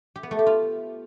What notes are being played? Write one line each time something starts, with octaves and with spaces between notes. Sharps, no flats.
G4
B3
A3
G4
F4